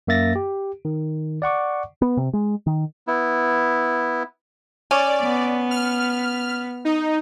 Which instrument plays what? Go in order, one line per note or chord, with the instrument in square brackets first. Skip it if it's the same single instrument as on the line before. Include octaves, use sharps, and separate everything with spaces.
[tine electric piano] F#2 A#3 E5 A6 A#6
G4
D#3
D5 F#5 C#6 D6
[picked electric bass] B3
C3
G#3
D#3
[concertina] B3 E4
[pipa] C#4 [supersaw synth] D5
[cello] B3
[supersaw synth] F6
D#4